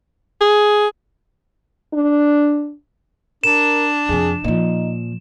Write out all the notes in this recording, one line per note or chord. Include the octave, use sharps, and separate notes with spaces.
G#4
D4
D4 A#4 E7
F2 C3 G#4
A#2 F3 D#4